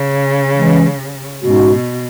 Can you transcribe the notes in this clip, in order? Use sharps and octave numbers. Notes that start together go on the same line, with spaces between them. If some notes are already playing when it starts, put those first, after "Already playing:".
Already playing: C#3
E3 G#3 C#4
G#2 B2 G#3 C#4 F#4
B2